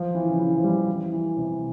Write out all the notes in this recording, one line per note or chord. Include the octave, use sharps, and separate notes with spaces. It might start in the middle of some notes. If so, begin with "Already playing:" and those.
Already playing: F3
E3
C#3
E3
F3
G3
E3
E3
C3